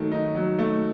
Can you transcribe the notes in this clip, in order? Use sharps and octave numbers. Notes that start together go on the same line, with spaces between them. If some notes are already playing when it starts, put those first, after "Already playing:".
Already playing: D#3 F#3 A3
D#4
F#3
A3